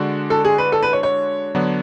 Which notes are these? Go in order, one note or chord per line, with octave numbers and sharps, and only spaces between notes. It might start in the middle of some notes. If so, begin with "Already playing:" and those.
Already playing: D3 G#3 D4 F#4
A4
G#4
B4
A4
B4
C#5
C#5
D3 F#3 B3 D4